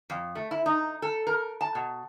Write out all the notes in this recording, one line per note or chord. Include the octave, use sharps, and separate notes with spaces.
F2
A3
E4
D#4
A4
A#4
A5
B2